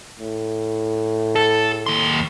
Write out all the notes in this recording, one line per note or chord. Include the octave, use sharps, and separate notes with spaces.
A2
A4
D#2 C6